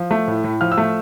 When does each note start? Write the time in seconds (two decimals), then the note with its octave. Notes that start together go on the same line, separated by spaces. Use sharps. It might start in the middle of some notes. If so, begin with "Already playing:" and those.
Already playing: F3
0.11 A3
0.27 A2
0.44 A2
0.61 F3 F6
0.72 E6
0.78 A3